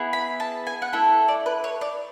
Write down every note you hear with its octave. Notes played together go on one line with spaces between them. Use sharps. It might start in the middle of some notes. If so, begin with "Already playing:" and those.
Already playing: B3 E4 G#4
B5
A5
G#5
F#5
A3 E4 A4 E5
D5
B4
C#5
D5